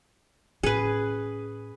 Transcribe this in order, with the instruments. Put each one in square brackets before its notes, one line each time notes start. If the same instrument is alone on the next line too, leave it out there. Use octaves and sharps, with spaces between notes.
[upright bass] A2 C#4 [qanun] G#4 B4